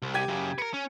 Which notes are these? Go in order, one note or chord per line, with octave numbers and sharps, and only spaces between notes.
C2
G4 G#6 D#7
F#2 C#3
A#4 B4 C#7
C#4